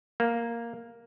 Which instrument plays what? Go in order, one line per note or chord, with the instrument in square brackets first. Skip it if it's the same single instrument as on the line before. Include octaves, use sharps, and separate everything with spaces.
[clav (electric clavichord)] A#3